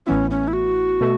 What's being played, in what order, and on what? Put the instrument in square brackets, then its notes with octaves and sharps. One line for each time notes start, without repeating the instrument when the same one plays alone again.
[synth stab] A1 A2 E3 B3 E4 [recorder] C#4
[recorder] C#4
E4
F#4
[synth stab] B2 A3